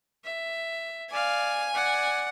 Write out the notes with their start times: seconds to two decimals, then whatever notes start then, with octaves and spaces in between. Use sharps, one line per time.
0.24 E5
1.11 D5 F5 G#5
1.73 D5 F#5